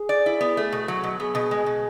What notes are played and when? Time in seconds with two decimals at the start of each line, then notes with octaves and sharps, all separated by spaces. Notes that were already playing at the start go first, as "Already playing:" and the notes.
Already playing: G#4
0.09 D5
0.26 E4
0.41 B3
0.57 A3
0.72 B2
0.88 F#3
1.04 B2
1.20 B3 G#4
1.35 B2
1.51 G#3
1.66 B2